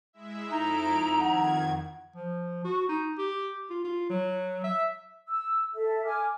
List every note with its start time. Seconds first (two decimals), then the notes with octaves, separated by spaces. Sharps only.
0.13 G#3 E4 E5
0.52 F2 D#4 E4 A#5 D7
1.20 F2 D#3 F#5 G#6
2.15 F3
2.65 F#4
2.89 D#4
3.19 G4
3.70 F4
3.84 F4
4.10 F#3
4.64 E5
5.28 E6
5.74 A4 E5
6.05 G#5 D6 F6